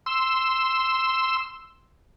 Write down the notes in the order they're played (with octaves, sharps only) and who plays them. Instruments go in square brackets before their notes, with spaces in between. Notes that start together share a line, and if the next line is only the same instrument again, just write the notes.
[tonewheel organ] C6 E6